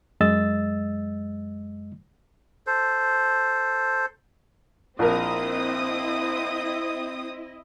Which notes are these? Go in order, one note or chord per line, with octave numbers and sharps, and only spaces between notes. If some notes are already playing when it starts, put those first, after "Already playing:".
F#2 G#3 D#5 E6 A6
A4 C5
A#1 C4 E4 A#4 C5 D#5 D#6